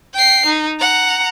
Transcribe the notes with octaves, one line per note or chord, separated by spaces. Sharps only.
G5 C7
D#4
F#5 A#5